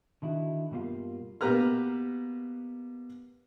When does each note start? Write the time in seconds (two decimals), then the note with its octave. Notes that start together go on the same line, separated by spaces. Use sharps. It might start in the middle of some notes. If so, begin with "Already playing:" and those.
0.22 D3 D#3 E4 F#4
0.71 G2 B2 G3 A#3 F4
1.41 B2 A#3 G4 B4 A#5 F6